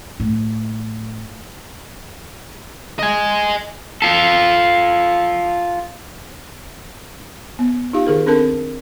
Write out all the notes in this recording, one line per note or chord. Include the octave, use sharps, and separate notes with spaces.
A2
D#5 G#5
F4 A4
B3
D#4 F4 G4 F5
D#3 G#4 A#4
C4 D4 A4 A#4 A5